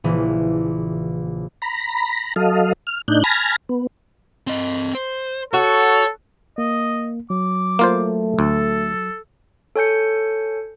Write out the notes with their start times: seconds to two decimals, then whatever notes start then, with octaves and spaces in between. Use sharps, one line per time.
0.04 A#1 C#3 E3
1.62 A#5 B5
2.36 F#3 A4 D#5 F5
2.87 F6
3.08 A2 D4 D#4 F#6 G6
3.24 G#5 A5 B5 F6 A#6
3.69 B3
4.47 C4 D#5
4.95 C5
5.53 F#4 A4 C#5
6.58 A#3 D#5
7.30 F#3 D6
7.79 A3 A#3 F4 C5
8.39 D2 A4
9.76 A4 C#5 G#5 G6 C#7